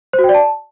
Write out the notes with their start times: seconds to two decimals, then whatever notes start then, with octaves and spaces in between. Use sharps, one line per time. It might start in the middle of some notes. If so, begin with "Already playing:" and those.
0.13 C5
0.19 F#4
0.24 G5
0.29 D5
0.34 A5